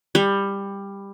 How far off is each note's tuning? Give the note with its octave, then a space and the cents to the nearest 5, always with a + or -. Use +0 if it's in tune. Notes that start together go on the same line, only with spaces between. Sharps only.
G3 +15